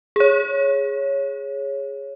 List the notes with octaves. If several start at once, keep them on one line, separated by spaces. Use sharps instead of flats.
G#4 C#5